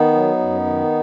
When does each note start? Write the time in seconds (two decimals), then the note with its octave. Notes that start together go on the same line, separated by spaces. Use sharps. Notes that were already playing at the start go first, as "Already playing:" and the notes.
Already playing: D#3 B3 D#4
0.14 F#3
0.39 F#2
0.65 D#3